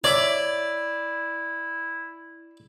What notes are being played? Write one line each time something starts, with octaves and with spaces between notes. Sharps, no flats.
E4 C#5 D5 E5